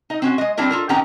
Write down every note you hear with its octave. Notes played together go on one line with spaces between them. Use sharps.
D#4 D#5
C4 C#4 F#4
G#3 D#5
G3 C4 D4 E4 A#4
F4 A4 A#4
D#3 B3 C#4 G4 G5 A#5